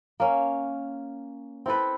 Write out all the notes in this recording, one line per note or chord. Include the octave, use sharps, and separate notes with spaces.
A#3 C#4
C4 E4 A4 B4